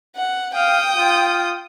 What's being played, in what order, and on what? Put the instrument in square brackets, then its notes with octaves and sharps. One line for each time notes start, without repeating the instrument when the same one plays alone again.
[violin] F#5
[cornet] F5 [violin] G5 D#6
[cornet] F4